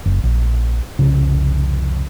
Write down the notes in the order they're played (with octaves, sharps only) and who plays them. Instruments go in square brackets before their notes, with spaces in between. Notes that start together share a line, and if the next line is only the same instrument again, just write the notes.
[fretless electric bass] F#1
A#1
[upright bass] C2 F2 [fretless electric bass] C#3